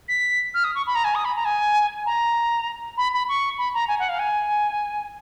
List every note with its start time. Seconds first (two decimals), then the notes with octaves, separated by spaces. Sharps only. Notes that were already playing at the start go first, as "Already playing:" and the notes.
0.08 B6
0.54 F6
0.64 D#6
0.75 C#6
0.87 B5
0.95 A#5
1.04 G#5
1.15 D#6
1.25 B5
1.36 A#5
1.45 G#5
2.06 A#5
2.97 B5
3.13 B5
3.28 C#6
3.58 B5
3.74 A#5
3.88 G#5
3.99 F#5
4.09 F5
4.19 G#5